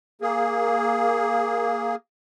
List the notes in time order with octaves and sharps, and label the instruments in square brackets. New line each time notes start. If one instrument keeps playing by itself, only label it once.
[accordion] A#3 G#4